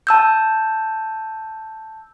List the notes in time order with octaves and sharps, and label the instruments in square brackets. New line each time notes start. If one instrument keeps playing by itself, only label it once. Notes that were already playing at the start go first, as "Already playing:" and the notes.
[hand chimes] A5 E6 G6